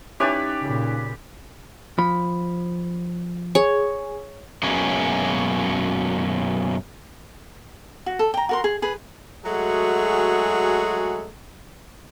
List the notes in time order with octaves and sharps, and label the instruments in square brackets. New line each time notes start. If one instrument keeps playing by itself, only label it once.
[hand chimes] C#4 D#4 [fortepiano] E4 C#5 G#5 [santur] G4 B4 D5
[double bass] A#2 C#3
[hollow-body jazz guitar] F3 [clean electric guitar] B5
[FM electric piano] G#4 [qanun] C#5
[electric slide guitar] F#2 B2 G#3 A#3 C#4
[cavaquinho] F#4
A4
G5 A#5
F#4 A#4 C6
G#4
G#4 B4
[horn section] F#3 G#3 A3 F#4 G#4